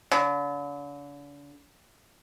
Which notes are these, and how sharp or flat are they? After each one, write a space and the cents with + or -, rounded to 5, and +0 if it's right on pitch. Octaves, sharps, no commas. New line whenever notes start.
D3 -40